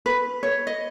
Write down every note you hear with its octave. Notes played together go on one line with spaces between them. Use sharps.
B4
C#5
D#5